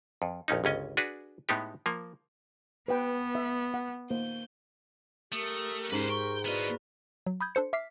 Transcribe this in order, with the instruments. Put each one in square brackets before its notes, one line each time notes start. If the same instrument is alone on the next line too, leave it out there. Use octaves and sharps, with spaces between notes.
[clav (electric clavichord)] F2
A#1 F2 C#4 D#4
G1 C#2 C#4 D#5
D4 F#4 G#4 B4
A2 G#3 B3 D#4 G4
F3 A#3
[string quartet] B3 [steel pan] B4 G5
[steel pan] E5
F#5
[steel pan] A#3 C5 [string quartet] G6
[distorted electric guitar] A3 [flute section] G4 A#4 [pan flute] D#6
[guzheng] G#2 B5 [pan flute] C#4 [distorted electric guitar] B4 C5
[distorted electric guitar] G5 [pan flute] C#6
[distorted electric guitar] B3 D#5 [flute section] E4 B4 D5 [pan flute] F#4 [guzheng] F5
[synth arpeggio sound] F#3
B5 D#6 G6 G#6
D4 A4 C5 C#7
E5 D6 F6 B6 C7